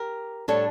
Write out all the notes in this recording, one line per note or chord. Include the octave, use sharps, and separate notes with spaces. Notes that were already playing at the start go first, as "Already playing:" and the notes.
Already playing: G4 A#4
A2 G3 D4 A4 C#5